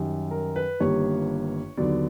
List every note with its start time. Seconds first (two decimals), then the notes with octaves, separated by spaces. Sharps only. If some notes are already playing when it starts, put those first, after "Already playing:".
Already playing: F#2 D#3 G3
0.31 A#4
0.56 B4
0.80 G1 G2 D#3 G3 A#3 C#5
1.77 D#2 D3 F#3 B3 D5